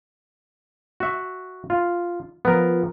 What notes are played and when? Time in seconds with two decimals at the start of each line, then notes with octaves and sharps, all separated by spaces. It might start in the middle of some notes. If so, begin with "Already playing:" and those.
1.00 F#4 E5
1.70 F4
2.45 F3 B3 A#4